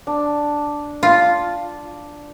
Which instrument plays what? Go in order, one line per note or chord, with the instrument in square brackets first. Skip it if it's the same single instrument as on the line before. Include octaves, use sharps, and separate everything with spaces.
[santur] D4
[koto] F4